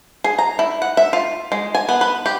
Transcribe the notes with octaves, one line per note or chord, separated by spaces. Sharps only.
G#4
A#5
E4
F#5
E5
F4
G#3
G#5
B3
B4
G4